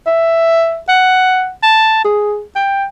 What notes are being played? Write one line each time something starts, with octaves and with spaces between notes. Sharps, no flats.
E5
F#5
A5
G#4
G5